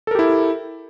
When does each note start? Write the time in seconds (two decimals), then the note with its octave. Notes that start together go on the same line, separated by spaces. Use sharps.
0.07 A4
0.11 A#4
0.15 G4
0.19 E4